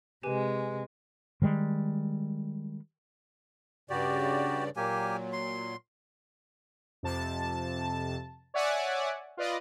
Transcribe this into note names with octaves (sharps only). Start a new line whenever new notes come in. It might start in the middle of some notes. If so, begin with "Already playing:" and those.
C3 G#3 G4 B4 G#5
D#3 F3 G3 G#3
G2 C#3 F#4 G4 D5
A#2 F#3 A#3 G4 G#5
C6
F2 C3 A5
C#5 D5 E5 F#5 G#5 D6
F4 B4 D5 D#5